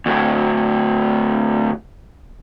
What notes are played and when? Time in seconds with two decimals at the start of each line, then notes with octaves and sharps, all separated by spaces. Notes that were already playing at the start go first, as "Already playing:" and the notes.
0.06 D2 A2